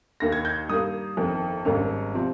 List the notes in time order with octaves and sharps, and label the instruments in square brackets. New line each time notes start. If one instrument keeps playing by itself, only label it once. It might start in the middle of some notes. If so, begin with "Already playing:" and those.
[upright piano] D#2 D#3 A#3 A#6
G#6
G6
G2 D#3 A#3 D#6
G1 F2 D#3
G#1 G2 D#3 A#3 C#4
C3 F3 C4